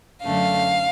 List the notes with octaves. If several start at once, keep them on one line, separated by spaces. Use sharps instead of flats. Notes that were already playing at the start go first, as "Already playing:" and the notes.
F#2 D3 F#3 A3 F5